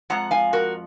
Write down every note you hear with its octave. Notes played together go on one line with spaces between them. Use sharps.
F2 F3 G#3 F#5 A#5
F5 G#5
F#4 A#4